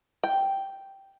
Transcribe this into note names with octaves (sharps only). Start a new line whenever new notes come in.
G5